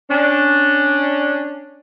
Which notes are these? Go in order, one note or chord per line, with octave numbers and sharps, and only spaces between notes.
C#4 D4